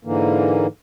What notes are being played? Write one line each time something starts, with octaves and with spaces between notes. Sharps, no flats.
G#2 D3 E3 A#3